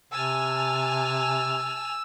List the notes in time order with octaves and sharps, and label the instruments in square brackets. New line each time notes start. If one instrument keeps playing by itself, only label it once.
[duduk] C3 [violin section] G#5 A5 F6 [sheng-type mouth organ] E6